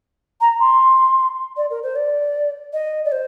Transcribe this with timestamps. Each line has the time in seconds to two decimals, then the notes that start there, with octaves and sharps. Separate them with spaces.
0.41 A#5
0.60 C6
1.57 D5
1.70 A#4
1.83 C5
1.95 D5
2.73 D#5
3.05 D5
3.12 C5